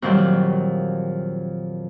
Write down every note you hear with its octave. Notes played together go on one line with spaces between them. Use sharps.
F2 A#2 D#3 F#3 G3